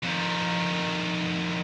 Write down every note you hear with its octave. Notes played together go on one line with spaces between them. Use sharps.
F2 D#3